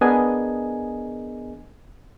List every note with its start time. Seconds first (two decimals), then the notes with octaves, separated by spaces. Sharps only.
0.01 B3 D4 G#4 A#4 D#5 G#5